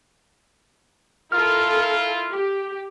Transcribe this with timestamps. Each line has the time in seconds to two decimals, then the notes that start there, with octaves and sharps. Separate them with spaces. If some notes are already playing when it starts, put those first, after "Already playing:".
1.32 E4 F4 A4 A#4 F6
2.32 G4